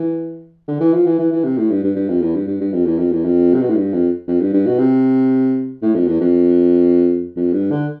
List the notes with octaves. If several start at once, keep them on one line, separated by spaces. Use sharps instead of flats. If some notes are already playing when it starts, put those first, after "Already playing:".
Already playing: E3
D3
E3
F3
E3
E3
E3
C3
A2
G2
G2
G2
F2
E2
G2
G2
G2
F2
E2
F2
E2
F2
C3
B2
A2
G2
F2
F2
G2
G2
B2
C3
A2
F2
E2
F2
F2
G2
D3